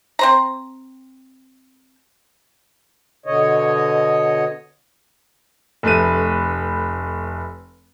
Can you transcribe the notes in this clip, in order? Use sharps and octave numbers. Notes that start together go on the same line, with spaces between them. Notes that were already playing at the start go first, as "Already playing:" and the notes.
C4 C5 A#5
B2 D3 C#5 D#5
F1 A3 B4 D#7